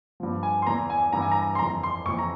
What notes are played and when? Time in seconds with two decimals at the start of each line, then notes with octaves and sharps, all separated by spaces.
0.20 G2 F3
0.43 G#5
0.62 C6
0.67 E2 E3 A#5
0.90 G#5
1.13 G2 E3 A#5
1.22 G#5
1.32 A#5
1.55 C6
1.59 F2 E3 A#5
1.83 C6
2.06 F2 E3 C#6
2.19 A#5